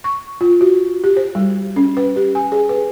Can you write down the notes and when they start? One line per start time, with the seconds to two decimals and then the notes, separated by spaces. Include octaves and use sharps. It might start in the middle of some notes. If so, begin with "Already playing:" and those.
0.04 C#6
0.41 F4
0.61 F#4
1.04 G4
1.17 C5
1.35 G3
1.76 C#4
1.97 B4
2.16 G4
2.35 G#5
2.52 G#4
2.69 B4